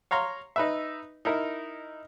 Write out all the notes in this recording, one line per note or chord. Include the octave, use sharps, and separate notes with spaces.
C#5 F5 A#5 C6
D#4 B4 E5
D#4 E4 A#4